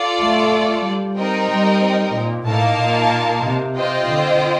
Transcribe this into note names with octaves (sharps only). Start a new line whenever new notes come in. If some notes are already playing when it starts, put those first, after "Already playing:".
Already playing: F4 A4 D5
A3
G3
C4 D#4 A#4 D#5 G5
G3
A#2
A2 A#3 D#4 A#4 F5 A5
A#2
C3
C4 F4 C5 D#5 G5
D3